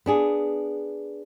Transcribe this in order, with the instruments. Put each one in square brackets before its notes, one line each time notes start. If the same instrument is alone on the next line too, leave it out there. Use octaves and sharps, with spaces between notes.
[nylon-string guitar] B3 D4 G#4